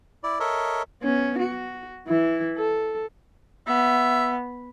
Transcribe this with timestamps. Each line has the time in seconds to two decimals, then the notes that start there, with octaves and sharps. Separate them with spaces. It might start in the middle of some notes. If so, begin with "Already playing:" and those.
0.23 E4 D5
0.40 A4 A#4 C#5 D#5 E5
1.02 B3 C#4
1.39 F#4
2.08 E3 E4
2.58 A4
3.67 B3 E5